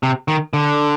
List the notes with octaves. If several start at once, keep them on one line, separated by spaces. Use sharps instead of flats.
C3
D#3
D3